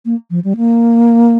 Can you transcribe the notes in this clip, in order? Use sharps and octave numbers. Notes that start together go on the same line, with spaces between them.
A#3
F3
G3
A#3